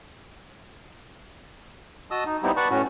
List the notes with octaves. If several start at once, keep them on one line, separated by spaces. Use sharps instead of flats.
F#4 D#5 A5 D#6 E6
D#4
G3 B3 C4 D#4 E4 G4
B4 D5 F#5 A5 C#6
A2 C#4 F#4